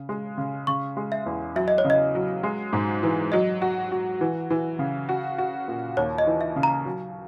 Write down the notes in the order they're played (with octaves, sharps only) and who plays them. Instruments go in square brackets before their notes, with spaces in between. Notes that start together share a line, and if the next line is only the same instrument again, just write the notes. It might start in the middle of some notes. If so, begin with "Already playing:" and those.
Already playing: [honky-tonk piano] C#3
G#3
C#3
[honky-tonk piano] C#3 [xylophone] C#6
[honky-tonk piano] G#3
[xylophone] E5
[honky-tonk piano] E2
[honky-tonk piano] F#3 [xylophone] E5
[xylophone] D#5
C#5
[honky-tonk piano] C#3
[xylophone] D#5
[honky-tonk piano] F#3
G#3
G#2
E3
[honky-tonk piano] F#3 [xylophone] D#5
[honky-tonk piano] F#4
F#4
E3
E3
C#3
F#4
F#4
A#2
[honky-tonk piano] D#2 [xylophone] C#5
[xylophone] D#5
[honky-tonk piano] E3
[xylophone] E5
[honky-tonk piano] C#3
[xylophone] A#5
[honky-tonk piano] F#3